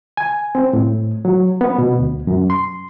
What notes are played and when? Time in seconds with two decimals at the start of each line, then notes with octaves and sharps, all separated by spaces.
0.17 G#5
0.55 C4
0.73 A2
1.25 F#3
1.61 B3
1.78 B2
1.99 D2
2.27 F#2
2.50 C6